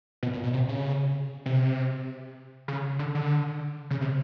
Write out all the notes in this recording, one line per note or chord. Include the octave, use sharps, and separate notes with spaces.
B2
A#2
B2
C3
C#3
C3
C#3
D3
D3
C#3
C3